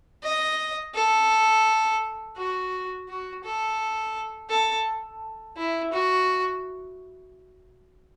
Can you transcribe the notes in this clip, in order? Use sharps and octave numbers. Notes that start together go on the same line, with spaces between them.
D#5
A4
F#4
F#4
A4
A4
E4
F#4